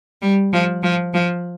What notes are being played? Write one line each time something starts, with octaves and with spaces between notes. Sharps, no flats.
G3
F3
F3
F3